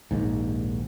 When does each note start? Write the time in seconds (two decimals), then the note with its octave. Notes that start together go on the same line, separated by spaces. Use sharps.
0.11 A#1 D#2 G#2